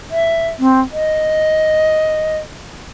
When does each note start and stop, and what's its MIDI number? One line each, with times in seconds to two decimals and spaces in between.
0.11 0.49 76
0.59 0.80 60
0.92 2.38 75